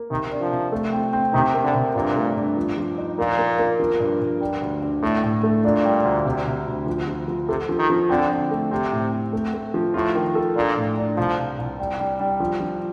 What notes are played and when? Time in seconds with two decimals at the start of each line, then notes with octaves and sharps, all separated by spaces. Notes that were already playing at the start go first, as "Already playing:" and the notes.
Already playing: A#3
0.10 C3 D#3
0.31 D4
0.41 F3
0.52 C3
0.72 A3
0.93 C4
1.13 C4
1.33 C3 D#3
1.54 A#3
1.64 D3
1.74 C3
1.95 G2 A#2
2.16 A3
2.36 G2
2.57 F3
2.78 F3
2.98 D#4
3.19 A#2 A#3
3.38 A#3
3.59 A#3
3.80 F3
4.00 G2
4.21 G2
4.40 G3
4.62 D2
4.82 D3
5.02 A2 A3
5.23 A2
5.43 A3
5.64 A#2 D4
5.85 G3
6.05 D2
6.25 C3
6.46 C3
6.67 D2
6.87 F3
7.08 F3
7.28 F3
7.49 C3 A4
7.69 F3
7.79 D#3
7.90 F3
8.09 D3 C4
8.31 D3
8.51 A3
8.71 C3 C4
8.92 A2
9.12 C4
9.33 A3
9.54 A3
9.74 F3
9.94 A2 F4
10.15 D#3
10.35 A4
10.55 A#2 D4
10.76 A2
10.98 D4
11.17 C2 F3
11.38 C2
11.58 C2
11.79 G3
12.00 G3
12.20 G3
12.40 F3
12.60 F3